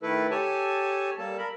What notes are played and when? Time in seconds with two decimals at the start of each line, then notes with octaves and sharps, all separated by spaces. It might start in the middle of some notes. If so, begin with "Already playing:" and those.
0.03 D#3 A3 E4 A4 B4
0.31 G4 A4 C#5 G#5 A5
1.18 G3 A#3 A4 A5
1.38 A#4 B5